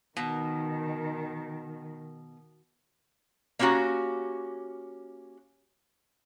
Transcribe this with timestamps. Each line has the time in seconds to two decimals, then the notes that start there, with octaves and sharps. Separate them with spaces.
0.17 B2 D#3
3.59 A#3 C4 C#4 E4 F#4 G4